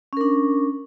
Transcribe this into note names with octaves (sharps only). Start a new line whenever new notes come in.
C#4 D4 A#4